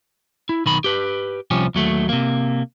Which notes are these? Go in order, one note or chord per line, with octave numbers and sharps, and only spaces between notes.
E4
B1 D#3 B5
G4 B4
C2 F3 C#4 G4
D#2 F#3 A3
C3 A#3